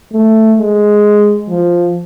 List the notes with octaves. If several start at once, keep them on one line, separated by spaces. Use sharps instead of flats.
A3
G#3
F3